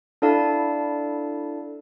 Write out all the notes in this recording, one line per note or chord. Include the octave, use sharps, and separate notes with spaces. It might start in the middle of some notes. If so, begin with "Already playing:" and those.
D4 E4 A4 D5 F5 A5